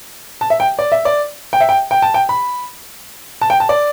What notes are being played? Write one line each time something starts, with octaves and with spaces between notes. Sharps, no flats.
A5
E5
G5
D5
E5
D5
G5
E5
G5
G5
A5
G5
B5
A5
G5
A5
D5